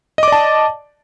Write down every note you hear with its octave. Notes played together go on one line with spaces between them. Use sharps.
D5 D#5 A5 D6